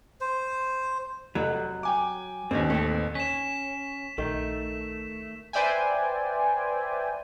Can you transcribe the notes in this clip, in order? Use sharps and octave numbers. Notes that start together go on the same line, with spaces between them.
C5
F1 F#3
G5 G#5 D6
A1 D#2 C4 C#4
A3 C4
C#4 B6 E7
A#1 D#3 A3
B4 C5 D5 E5 G5 G#5